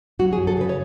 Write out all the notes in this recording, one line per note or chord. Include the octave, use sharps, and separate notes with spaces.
F#3 F#4
G#4
F#2
A4
C#3 B4
C#5